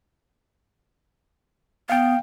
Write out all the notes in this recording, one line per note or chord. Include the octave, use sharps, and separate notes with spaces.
B3 F5 G5